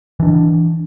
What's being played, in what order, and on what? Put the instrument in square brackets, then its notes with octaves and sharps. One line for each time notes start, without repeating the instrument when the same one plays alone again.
[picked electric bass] E3 D4